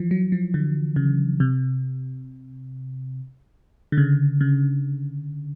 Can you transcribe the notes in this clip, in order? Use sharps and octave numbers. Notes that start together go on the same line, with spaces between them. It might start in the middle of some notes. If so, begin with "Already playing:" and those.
Already playing: E3 F3
F#3
F3
D3
C#3
C3
D3
C#3
C#3